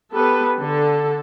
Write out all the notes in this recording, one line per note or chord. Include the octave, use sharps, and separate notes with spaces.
B3 G4 A4 B4
D3 A4